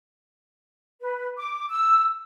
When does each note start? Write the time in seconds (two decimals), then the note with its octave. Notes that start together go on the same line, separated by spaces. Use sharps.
1.00 B4
1.38 D6
1.69 E6